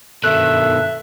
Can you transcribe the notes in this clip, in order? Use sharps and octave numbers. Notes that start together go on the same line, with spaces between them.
G2 B2 D#3 A4 E5 E6 F#6